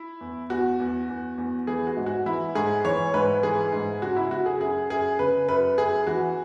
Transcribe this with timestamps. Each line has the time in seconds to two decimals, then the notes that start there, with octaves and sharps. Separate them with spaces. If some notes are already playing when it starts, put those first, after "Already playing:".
Already playing: E4
0.21 E2
0.50 E2 F#4
0.80 E2
1.09 E2
1.38 E2
1.67 E3 G#4
1.87 F#4
1.96 G#2
2.06 F#4
2.26 E3 E4
2.55 G#2 G#4
2.85 E3 C#5
3.14 G#2 B4
3.43 E3 G#4
3.72 G#2
4.02 C#3 F#4
4.16 E4
4.31 C#3 F#4
4.46 G#4
4.60 F#2 G#4
4.90 F#2 G#4
5.19 C#3 B4
5.48 F#2 B4
5.78 F#2 G#4
6.07 E3 F#4